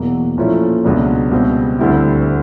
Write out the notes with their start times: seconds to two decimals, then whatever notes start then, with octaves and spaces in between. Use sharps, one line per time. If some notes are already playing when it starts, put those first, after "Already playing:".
Already playing: E2 B2 F#3 A#3
0.38 A#2 F3 A3 C#4 E4
0.84 C#2 B2 F#3 B3 D4
1.31 C#2 B2 G3 C4
1.79 D2 D3 G3 C4 E4